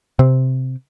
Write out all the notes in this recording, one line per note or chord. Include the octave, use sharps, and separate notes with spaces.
C3 C4